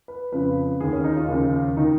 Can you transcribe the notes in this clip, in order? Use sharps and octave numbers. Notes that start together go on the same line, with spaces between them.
B4
F2 C#3 F3 B4
D#2 D#3 G#4
C#4
D#4
F4
D#2 C#3 F3
D#3 D#4